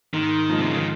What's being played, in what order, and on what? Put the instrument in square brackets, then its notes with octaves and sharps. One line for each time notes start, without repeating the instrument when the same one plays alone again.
[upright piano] G#2 [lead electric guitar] D#3
[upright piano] F3 G#3
[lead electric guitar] C3
C#3
D#3